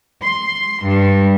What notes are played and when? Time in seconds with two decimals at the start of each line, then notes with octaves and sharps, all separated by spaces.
0.23 C6
0.84 G2